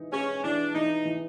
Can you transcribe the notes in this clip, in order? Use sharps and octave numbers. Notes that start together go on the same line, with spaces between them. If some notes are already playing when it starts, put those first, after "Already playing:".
Already playing: E3 D#4
G#3 C#4
E3 D4
E3 D#4
E3